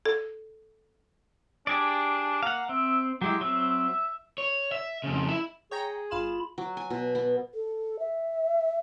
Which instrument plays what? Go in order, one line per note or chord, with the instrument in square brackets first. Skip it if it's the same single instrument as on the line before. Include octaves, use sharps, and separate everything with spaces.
[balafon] A4
[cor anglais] D4 [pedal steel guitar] G4 G#4 D5
[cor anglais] A#3 [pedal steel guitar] F5 F#5
[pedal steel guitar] C4 [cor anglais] E5
[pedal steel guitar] F#3 G#3 E4 [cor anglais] G4
[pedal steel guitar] F#3 C4 [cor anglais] E5
[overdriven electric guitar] C#5
E5
F2 C#3
E4 E5
[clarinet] G#4 [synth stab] C#5 G5 A#5
[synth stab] G1 F5 E7 [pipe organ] F4 B5
[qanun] F#3
G#5
B2
B3
[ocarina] A4
E5